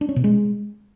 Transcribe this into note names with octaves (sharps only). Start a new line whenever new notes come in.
D4
C#4
B2
G#3